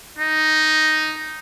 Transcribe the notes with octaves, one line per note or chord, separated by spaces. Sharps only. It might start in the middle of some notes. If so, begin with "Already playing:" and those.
D#4